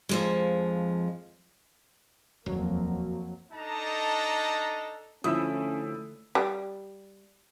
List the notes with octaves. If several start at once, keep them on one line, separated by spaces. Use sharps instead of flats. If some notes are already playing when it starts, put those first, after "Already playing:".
F2 F3 G#3
D#1 F2 F#3 A#3
D4 D#4 A4 D#5 A5 A#5
D2 F3 C#4 E4 D#6 E6
G3